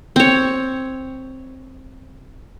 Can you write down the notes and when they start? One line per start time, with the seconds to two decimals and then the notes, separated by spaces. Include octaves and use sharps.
0.16 C4 C#5